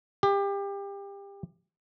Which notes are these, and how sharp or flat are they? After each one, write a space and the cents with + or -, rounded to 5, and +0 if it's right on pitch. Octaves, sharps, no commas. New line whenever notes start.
G4 +25